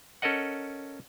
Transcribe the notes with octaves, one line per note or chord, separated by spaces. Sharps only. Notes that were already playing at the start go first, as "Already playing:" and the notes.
C#4 A4 A#4 D#5 F#5